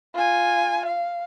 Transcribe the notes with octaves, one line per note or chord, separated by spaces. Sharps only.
F4 G#5
F5